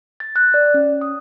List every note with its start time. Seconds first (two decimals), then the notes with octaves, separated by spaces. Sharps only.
0.20 A6
0.36 F#6
0.54 D5
0.74 C#4
1.01 D#6